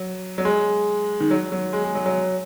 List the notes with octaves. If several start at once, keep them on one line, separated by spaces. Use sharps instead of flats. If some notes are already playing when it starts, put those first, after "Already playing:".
Already playing: F#3
F#3
G#3
D#3
F#3
F#3
G#3
G#3
F#3
F#3